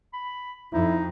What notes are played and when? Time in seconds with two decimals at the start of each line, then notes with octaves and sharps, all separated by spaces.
0.13 B5
0.73 F2 D#4 E4